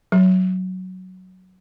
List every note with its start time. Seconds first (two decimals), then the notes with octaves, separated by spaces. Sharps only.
0.12 F#3